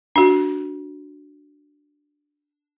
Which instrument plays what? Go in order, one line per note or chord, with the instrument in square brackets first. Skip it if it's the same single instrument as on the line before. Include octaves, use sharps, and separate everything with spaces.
[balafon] D4 F#4